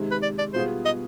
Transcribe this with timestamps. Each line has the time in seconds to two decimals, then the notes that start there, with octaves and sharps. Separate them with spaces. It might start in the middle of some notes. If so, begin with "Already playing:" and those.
Already playing: C3 D#3 G#3
0.11 B4
0.23 D5
0.39 D5
0.54 B2 G3 B3 F4 G#4 C5
0.86 D#5